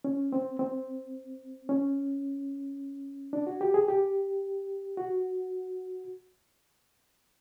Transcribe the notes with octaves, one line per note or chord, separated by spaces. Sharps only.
C#4
C4
C4
C#4
D4
F#4
G4
G#4
G4
F#4